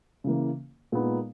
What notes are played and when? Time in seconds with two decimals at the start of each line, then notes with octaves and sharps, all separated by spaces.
0.24 C#3 E3 A#3
0.92 A#2 G#3 B3 D#4